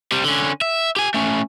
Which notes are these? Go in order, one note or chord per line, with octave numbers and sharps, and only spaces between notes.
C3 G3
D3 C#4
E5
G4 G#5
A3 C#4